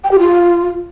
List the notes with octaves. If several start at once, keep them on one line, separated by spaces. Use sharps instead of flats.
G5
G4
F4